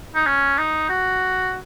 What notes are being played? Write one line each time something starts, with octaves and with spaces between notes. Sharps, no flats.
D#4
C#4
D#4
F#4